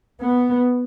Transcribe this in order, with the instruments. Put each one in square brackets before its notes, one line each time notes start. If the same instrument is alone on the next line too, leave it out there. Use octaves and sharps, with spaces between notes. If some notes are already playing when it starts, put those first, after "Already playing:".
[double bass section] B3